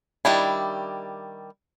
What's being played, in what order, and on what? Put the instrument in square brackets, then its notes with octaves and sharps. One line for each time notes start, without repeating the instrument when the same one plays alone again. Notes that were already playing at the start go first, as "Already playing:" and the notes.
[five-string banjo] D#3 G3 D4 E4